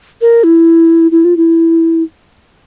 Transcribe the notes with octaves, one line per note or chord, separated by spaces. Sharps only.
A#4
E4
E4
F4
E4